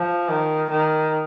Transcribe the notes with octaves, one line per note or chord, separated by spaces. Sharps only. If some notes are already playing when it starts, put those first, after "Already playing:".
Already playing: F3
D#3
D#3